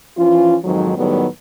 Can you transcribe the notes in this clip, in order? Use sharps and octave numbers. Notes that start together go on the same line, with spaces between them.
E3 F3 C#4 F4
F2 G#2 D#3 F#3
A2 D#3 F#3 G3 B3